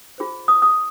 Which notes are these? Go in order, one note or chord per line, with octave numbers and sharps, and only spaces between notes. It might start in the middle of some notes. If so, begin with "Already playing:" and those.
F4 G#4 C5
D#6
D#6